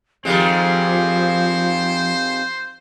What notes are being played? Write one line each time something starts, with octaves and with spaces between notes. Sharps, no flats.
D#3 F3 G3 G#3 C4 F4 C5